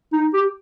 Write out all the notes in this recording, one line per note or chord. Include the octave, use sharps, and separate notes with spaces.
D#4
G4